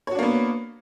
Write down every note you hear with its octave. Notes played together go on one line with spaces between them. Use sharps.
A#3 B3 D4 F#4 C#5